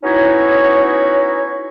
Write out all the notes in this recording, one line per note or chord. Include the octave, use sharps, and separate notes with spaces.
B3 C#4 D#4 E4 F#4 C#5